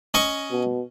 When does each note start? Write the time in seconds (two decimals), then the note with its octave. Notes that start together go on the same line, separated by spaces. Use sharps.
0.14 C#4 D#5 C#6
0.51 B2